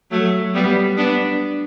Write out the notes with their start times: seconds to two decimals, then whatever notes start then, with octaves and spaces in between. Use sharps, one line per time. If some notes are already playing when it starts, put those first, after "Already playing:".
0.11 F#3 A3
0.54 G3 B3
0.97 B3 D4